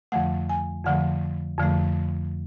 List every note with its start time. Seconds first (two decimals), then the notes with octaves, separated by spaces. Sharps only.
0.12 F2 D3 F3 A3 F#5
0.49 G#5
0.85 F2 D3 F3 A3 F#5
1.58 F2 D3 F3 A3